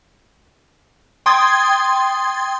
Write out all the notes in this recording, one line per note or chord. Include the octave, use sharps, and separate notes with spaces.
G5 C6 D#6 G#6 A6